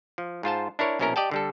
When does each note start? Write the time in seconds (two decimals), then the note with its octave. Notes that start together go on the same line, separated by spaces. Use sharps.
0.18 F3
0.43 G#2 F4 C5 A5
0.79 D4 E4 A#4 C#5
0.99 A#1 B2 C#4 E4 A#4 A#5
1.16 G4 D5 D#5 G5 A5
1.31 D3 G3 A4